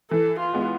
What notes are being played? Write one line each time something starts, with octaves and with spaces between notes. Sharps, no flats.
E3 A4
F4
G#3 B3